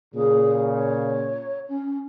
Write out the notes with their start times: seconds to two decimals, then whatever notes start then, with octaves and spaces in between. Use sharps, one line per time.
0.15 A#2 C#3 G#4
0.74 C#5
1.69 C#4